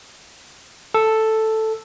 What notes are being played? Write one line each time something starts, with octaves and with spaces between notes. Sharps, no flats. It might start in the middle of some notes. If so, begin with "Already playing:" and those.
A4